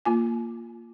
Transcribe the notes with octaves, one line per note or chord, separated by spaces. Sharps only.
A#3 F4 G#5